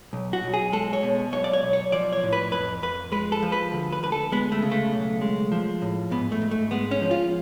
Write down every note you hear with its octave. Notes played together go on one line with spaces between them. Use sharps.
B1
F#4
B1
G#4
G#3 A4
C#5
B2
B1 C#5
D5
C#5
B1
C#5
F3 D5
C#5
A2
B4
F2 B4
F2 B4
G#3 B4
A4
F3
B4
D2
B4
D2 B4
A4
G#3 B3
A3
C#3
A3
B1
G#3
F3
A2
G#2 B3
A3
G#2
A3
G#3 B3
C#4
F3
F4